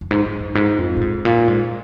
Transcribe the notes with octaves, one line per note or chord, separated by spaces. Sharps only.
F2
G#2
G#2
F2
G#2
F2
A#2
G#2
A#2
G#2